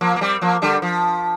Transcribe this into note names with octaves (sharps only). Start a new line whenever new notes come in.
F3 A#3
A#3
G3 C4
F3 A#3
D3 G3
F3